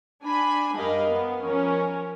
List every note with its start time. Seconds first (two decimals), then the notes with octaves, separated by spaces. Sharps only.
0.23 D4 G#5 B5
0.75 F#2 G3 A#4 D#5 F5
1.07 B3
1.42 F3 C#4 A#4